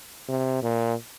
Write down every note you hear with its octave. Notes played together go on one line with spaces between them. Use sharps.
C3
A#2